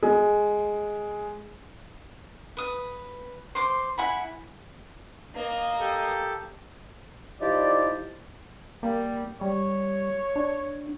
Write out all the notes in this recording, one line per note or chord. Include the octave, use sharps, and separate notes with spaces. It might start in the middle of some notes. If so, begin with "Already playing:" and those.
G#3
B4 D#6
C5 C6 D6
E4 F#5 G#5 B5
A#3 D#5
G4 A4
F3 D#4 E4 G4 D5
G3 A#3
G3 C#5
D4